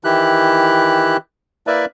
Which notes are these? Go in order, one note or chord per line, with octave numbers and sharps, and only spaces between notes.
D#3 E3 E4 G4 F#6
A#3 E4 A#4 B4 D5 E5